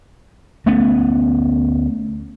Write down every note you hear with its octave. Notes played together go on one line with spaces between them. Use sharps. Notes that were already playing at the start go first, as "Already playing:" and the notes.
D2 A3 B3 C#4